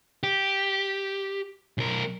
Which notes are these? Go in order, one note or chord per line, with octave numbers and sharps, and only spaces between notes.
G4
B1 A#4